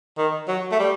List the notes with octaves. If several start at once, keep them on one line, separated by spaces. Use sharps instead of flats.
D#3
F#3
A3
G3